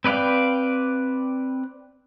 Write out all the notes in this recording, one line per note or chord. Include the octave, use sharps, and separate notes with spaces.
C4 B4 D5 F5 G5